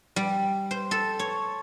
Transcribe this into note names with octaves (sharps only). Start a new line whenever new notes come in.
G3
C5
A4
C#5